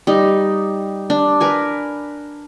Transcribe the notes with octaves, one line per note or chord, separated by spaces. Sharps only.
G3 D#4
D4
A#4 B4 G#5